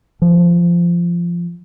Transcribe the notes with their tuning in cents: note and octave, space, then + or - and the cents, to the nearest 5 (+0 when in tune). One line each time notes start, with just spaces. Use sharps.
F3 -15